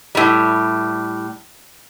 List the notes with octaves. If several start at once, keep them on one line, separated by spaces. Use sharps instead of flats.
A2 G3